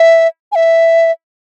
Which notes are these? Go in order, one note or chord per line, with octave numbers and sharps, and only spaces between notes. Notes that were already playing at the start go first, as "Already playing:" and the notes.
Already playing: E5
G#5
E5